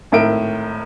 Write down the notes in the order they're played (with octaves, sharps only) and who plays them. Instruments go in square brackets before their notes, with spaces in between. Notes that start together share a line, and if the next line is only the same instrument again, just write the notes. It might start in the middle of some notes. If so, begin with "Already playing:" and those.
[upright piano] G#1 A2 A#4 E5 D7